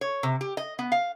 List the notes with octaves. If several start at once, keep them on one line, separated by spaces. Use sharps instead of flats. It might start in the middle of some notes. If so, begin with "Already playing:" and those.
C#5
C3
G4
D#5
B3
F5